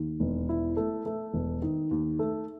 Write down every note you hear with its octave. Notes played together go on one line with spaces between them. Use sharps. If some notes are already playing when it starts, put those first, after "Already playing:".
Already playing: D#2
E1
E4
A3
A3
E1
D#3
D#2
A3